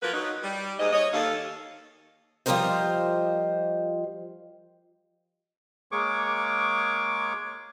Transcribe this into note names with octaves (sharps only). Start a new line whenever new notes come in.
F3 F#3 A#3 F4 A#4 B4
F#3 D#4
G3
D#2 G#2 D#5
C#5 D#5
D#2 A4 F5
F3 G3 F4 A#4 C5 D#5
G#3 A#3 G#4 C#5 C#6 D6